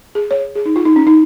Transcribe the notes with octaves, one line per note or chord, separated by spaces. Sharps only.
G#4
C#5
G#4
D#4
F4
D#4
C#4
D#4